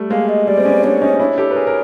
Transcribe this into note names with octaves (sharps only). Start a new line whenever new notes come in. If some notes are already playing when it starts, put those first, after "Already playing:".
Already playing: G3 A3
G#3 A#3 F5
D#5
G3 D5
C4
B3 C#4
C4 D4 C#5
C#4 D#4
D4 E4 C#5
G4 A4
B4
G#4 A#4
A#4